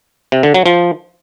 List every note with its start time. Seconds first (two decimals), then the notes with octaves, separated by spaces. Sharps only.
0.32 C3
0.43 D3
0.54 F#3
0.66 F3